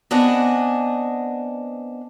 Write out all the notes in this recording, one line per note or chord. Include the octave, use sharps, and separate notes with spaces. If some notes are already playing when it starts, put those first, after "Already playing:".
B3 C4 D4 D#5 F#5 G#5